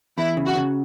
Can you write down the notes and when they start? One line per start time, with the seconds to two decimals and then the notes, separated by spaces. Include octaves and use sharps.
0.18 E2 E4
0.37 C#3
0.46 F#4
0.55 C#3